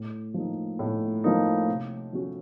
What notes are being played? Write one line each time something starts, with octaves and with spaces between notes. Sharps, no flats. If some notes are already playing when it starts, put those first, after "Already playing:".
Already playing: A2
F3 A#3 D#4
A2
F3 A#3 D#4
C3
F3 A3 C#4 F#4